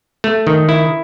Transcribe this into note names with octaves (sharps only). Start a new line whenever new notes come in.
A3
D#3
E4